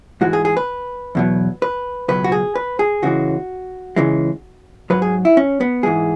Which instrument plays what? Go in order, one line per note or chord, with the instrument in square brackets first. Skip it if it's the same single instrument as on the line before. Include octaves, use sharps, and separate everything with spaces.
[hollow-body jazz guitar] G#2 E3 G#3 F#4
G#4
G#4
B4
E2 B2 F#3
B4
C#2 B2 F#3 B4
F#4
G#4
B4
G#4
C#2 C#3 E3 G#3 F#4
C#2 C#3 E3 G#3
G#2 F#3 B4
G#4
E4
C#4
B3
G#2 E3 G#3 G#4